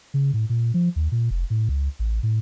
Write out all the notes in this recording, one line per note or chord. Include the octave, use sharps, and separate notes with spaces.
C#3
A2
A#2
F3
D#2
A#2
F1
A2
C#2
A1
A2